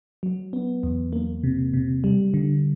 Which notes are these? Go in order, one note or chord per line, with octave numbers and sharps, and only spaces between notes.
F#3
B3
E2
A#3
C3
C3
G3
D3